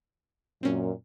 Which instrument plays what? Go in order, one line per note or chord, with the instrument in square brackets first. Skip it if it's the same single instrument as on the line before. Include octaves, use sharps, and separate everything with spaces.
[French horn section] F#2 A#2 [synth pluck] C4 C#4